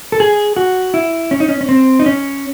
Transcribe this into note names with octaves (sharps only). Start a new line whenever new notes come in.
A4
G#4
F#4
E4
C#4
D#4
C#4
C#4
C4
D#4
C#4